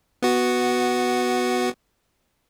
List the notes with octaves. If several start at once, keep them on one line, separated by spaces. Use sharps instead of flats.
B3 F#4